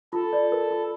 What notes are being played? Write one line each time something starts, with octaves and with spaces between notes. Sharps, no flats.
F4 A4
D5
A#4
F4